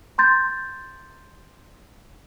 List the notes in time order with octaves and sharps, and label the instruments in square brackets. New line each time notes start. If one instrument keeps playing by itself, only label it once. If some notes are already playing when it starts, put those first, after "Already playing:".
[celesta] A#5 C6 G6 A6